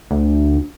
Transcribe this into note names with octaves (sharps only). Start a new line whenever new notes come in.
D2